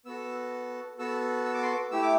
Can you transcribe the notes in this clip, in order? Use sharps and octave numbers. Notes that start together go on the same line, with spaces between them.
B3 F#4 A4 E6
B3 F#4 A4 E6
E6
D6
C6
D6
A3 E4 G4 E6
D6